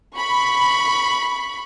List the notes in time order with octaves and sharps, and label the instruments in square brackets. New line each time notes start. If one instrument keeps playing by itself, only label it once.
[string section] B5 [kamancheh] C#6